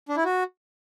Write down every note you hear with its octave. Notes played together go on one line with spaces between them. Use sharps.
D4
E4
F#4